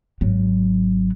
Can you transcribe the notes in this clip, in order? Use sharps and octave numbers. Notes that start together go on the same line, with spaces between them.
G#1 F#3